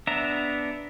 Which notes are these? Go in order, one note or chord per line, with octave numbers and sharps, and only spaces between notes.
B3 D4 E5 A#5